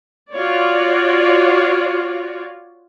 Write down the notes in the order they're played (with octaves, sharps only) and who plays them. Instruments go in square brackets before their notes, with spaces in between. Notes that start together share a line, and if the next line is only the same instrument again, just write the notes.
[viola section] F4 F#4 C#5 D5